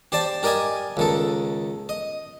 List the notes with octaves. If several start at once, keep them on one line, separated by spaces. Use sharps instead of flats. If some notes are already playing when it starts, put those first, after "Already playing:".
G4 C5 D5 A5
G4 A#4 D5 D#5 G#5
C#2 D#3 A4
D#5